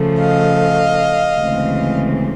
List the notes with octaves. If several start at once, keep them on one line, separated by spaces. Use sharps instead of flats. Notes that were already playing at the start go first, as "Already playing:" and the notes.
Already playing: C#3 F3 A3
D#5 F5
D2 C#3 E3 G#3 C4